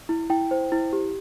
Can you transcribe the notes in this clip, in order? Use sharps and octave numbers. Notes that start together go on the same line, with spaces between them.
E4
E4 G5
C5
E4
G4